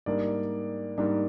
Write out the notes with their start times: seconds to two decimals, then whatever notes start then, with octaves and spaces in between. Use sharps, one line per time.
0.06 G#2 G3 A#3 D4 D5
0.98 G#2 G3 A#3 D4